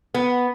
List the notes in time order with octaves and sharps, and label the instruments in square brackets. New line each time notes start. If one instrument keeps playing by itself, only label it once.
[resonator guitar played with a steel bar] B3